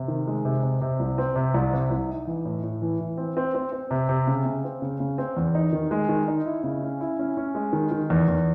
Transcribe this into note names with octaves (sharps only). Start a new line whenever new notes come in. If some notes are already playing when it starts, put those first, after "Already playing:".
Already playing: C3
D#3
G#3
C3
C3
C3
C2
C4
C3
C2
C3
C2
D#4
E3
A2
A2
E3
E3
C4
C4
C4
C4
C3
C3
C#3
C#3
C4
C#3
C#3
C4
E2
D#4
D#3
G#3
D#3
D#4
E4
C#3
C#4
E4
C#4
C#4
G#3
D#3
D#3
E2
E2